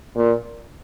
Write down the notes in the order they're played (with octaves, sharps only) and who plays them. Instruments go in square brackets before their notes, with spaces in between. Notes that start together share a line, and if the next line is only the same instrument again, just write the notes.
[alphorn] A#2